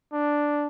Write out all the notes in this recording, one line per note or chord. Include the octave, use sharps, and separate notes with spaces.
D4